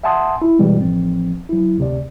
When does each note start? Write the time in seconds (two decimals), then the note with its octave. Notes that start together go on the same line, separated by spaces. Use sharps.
0.04 E5 F#5 G#5 A5 C6 D#6
0.42 E4
0.59 B2 E3 G3 G#3
0.80 A1 F3 C4
1.49 F#3 E4
1.78 D2 C3 D5